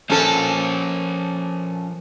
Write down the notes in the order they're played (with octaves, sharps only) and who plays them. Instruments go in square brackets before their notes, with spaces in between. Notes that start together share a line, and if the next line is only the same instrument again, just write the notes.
[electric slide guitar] F3 A#4 C5 [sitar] C#4 A4